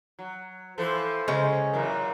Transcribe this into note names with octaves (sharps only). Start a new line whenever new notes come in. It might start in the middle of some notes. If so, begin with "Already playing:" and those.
F#3
E3 F3 A4 C5
C#3 G#3 C#4
F#2 A#2 E3 A#4